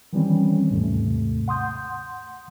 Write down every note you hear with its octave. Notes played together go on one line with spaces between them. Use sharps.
D#3 E3 G3 C4 C#4
D#2 G#2 C3 A3
F#5 C6 D#6 G6